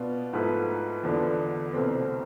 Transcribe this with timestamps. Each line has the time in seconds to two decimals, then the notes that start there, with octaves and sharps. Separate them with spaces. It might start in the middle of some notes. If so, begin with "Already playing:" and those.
Already playing: B2 B3 D4 F4
0.33 G#2 F3 A3 E4 B4
1.03 E2 D3 F3 B3 D4
1.73 C2 B2 A3 C4